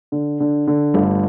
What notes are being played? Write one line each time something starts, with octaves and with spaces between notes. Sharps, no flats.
D3
D3
D3
G1 G3 A3